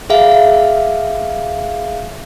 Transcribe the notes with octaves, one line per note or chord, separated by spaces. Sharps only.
G#4 E5 F5